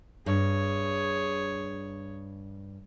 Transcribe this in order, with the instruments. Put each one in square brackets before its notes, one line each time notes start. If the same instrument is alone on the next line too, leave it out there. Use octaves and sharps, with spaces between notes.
[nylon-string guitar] G2 [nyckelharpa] G#4 C#5